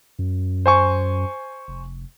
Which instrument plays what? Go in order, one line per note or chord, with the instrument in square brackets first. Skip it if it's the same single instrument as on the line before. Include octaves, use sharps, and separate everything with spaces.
[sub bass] F#2
[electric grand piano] C5 G#5 C#6
[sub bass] F1